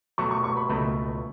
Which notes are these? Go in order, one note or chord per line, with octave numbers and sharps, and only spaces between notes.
B2 F#3 A3 C#6
C#6
C#6
B5
C#2 B2 A3 B5